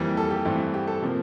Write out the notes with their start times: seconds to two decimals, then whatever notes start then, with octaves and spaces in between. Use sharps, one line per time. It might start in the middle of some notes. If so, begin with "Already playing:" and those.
Already playing: F2 E3 G3 A#3 C5
0.17 A4
0.31 G4
0.45 G2 E3 A3 C4
0.74 G4
0.88 A4
1.02 C3 F3 A#3